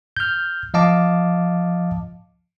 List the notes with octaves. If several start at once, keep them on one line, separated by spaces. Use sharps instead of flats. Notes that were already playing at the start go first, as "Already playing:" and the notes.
F6 G6
F3 D#5 F5 A5 D6